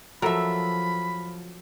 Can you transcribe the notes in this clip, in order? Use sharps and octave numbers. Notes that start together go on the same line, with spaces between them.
F3 F#3 A4 A#4 E5 B5